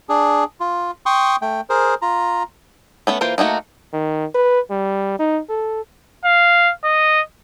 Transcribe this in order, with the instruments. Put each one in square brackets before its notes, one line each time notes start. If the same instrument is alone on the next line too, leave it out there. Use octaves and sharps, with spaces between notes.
[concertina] D4 G#4
F4
G5 C6 C#6 D#6
A3 G5
G#4 A#4 C5
F4 A#5
[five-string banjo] A3 B3 C#4
E3 A#3 F4 C5
A3 A#3 D#4 F#4
[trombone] D#3
B4
G3
D#4
A4
[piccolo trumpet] F5
D#5